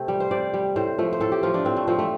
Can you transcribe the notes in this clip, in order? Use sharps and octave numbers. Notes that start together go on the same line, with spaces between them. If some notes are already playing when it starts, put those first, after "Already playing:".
Already playing: C3 A3 C4
G3
C5
C3 D5
G3
A2 C5
F3 A3
C5
A2 A4
G4
F3 A3 F4
D4
A2 C4
A3
F3 A3 C4
A3